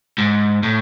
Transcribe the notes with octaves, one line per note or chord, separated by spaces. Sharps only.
G#2
A2